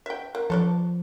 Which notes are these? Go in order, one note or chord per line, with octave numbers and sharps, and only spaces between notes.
E5 G5
A#3
F3 A4 C#5 D5